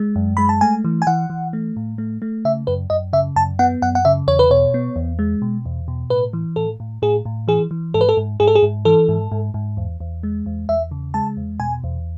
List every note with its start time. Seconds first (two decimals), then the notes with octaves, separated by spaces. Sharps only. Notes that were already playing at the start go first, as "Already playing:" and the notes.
Already playing: G#3
0.16 F#2
0.37 G#3 B5
0.49 A5
0.61 A3 G#5
0.84 E3
1.02 G#5
1.07 E3 F#5
1.30 E3
1.53 A3
1.76 A2
1.98 A3
2.22 A3
2.45 C#3 E5
2.67 F#2 B4
2.90 F#2 D#5
3.13 C#3 E5
3.36 F#2 A5
3.59 B3 F#5
3.82 F#2 F#5
3.95 F#5
4.05 C#3 E5
4.27 E2 C#5
4.39 B4
4.50 B2 C#5
4.74 B3
4.96 E2
5.19 G#3
5.42 B2
5.65 E2
5.88 B2
6.10 A2 B4
6.33 E3
6.56 A2 A4
6.80 A2
7.02 A2 G#4
7.25 A2
7.48 E3 G#4
7.71 E3
7.94 G#2 A4
8.01 B4
8.09 A4
8.17 G#2
8.40 G#2 G#4
8.47 A4
8.55 G#4
8.63 G#2
8.85 E3 A4
9.08 G#2
9.32 G#2
9.54 G#2
9.77 E2
10.00 E2
10.23 G#3
10.46 E2
10.69 E2 E5
10.91 C#3
11.14 G#3 A5
11.37 E2
11.60 B2 G#5
11.84 E2